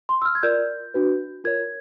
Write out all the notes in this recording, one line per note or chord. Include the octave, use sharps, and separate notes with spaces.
C6
E6
F6
G#6
F4 A#4 D5 G6
D4 F#4 B4
F4 A#4 C#5 G#6